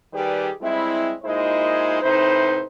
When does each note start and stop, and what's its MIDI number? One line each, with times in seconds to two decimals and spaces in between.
0.13 0.48 51
0.13 0.48 55
0.13 0.48 67
0.13 0.48 68
0.13 0.48 71
0.13 0.48 74
0.61 1.12 55
0.61 1.12 56
0.61 1.12 60
0.61 1.12 64
1.23 1.99 46
1.23 1.99 56
1.23 1.99 63
1.23 1.99 64
1.23 1.99 72
1.23 1.99 75
2.02 2.61 45
2.02 2.61 48
2.02 2.61 63
2.02 2.61 71
2.02 2.61 72